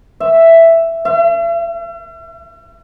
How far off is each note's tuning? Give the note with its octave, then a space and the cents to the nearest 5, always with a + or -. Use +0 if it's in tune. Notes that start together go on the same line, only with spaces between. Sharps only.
E5 +5
E5 +45